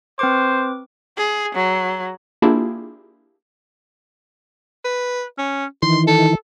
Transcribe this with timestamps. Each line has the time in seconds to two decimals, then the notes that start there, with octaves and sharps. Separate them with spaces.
0.19 C4 B4 C5 D6
1.17 G#4
1.55 F#3
2.42 A#3 D4 E4 F4 G4 G#4
4.85 B4
5.38 C#4
5.82 D#3 E3 C6
6.07 A4